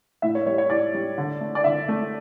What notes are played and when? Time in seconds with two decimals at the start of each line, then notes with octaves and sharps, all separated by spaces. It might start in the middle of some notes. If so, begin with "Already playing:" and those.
0.22 A2 E5
0.35 C#5
0.46 G3 C#5
0.58 C#5
0.70 A2 D5
0.94 G3
1.18 D3
1.41 A3
1.55 D5
1.64 D3 E5
1.88 A3